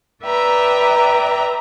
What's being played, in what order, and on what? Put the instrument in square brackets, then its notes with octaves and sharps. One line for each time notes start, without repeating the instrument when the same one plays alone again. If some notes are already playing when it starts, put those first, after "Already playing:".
[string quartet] B4 D5 E5 G5 A#5